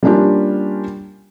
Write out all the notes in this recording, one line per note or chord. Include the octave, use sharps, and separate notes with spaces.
G3 A#3 C#4 D4 F4 G4